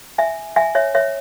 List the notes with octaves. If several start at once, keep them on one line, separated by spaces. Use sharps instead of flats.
E5 G#5
E5 G#5
C#5 E5
C#5 E5